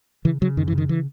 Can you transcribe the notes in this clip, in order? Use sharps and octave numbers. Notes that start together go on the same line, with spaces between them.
C#3 E3
C#3 F#3
F#2 D#3
E3
C#3
D#3
E3